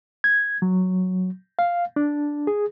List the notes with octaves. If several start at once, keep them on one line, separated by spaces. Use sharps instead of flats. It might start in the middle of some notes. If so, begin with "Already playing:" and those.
G#6
F#3
F5
D4
G#4